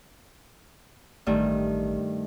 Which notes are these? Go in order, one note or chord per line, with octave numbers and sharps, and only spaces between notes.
A1 G2 D#3 A3